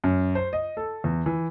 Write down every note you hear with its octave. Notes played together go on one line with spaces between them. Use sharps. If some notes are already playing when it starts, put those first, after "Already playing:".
F#2
C5
D#5
A4
E2
E3